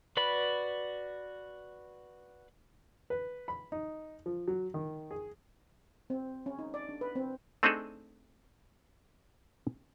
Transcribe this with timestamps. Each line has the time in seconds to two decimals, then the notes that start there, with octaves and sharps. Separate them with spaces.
0.17 F#4 B4 D5 B5
3.10 B4
3.48 B5
3.72 D#4
4.26 F3
4.48 F#3
4.74 D#3
5.11 G#4
6.10 C4
6.46 C#4
6.59 D#4
6.74 D5
6.89 D4
7.01 B4
7.16 C4
7.63 A3 C4 D4 D#4 G#4 A4